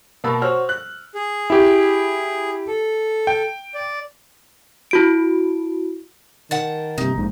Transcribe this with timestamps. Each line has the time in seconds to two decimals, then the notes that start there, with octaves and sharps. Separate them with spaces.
0.24 B2 A#3 A#4 A5 B5 E6
0.42 F#4 C5 C#5 E6 F6
0.69 F#6
1.14 G#4
1.50 E4 G4
2.67 A4
3.27 G5
3.74 D5
4.91 E4 F#4 D7
6.51 D#3 F#5 A5
6.98 G2 C3 D#4
7.14 A#1 G#2